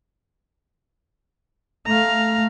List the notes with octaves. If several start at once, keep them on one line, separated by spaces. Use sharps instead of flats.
A3 F5 A#5